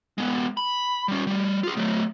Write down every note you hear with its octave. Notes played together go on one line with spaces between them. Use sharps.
G#3 B3
B5
G3 C#4
G3 A3
F4 G#4
F#3 A3